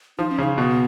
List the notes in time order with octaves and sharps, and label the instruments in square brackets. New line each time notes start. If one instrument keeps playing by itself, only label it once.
[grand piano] F3 [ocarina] D#4
[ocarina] C#4
[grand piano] C#3 [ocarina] D#4
[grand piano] B2 [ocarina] B3